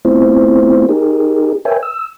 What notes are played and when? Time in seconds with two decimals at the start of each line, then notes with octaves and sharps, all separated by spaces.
0.05 A3 B3 C4 E4 F4 C5
0.89 D#4 G4 G#4 A#4
1.65 A#4 B4 C#5 E5 G5 G#5
1.83 E6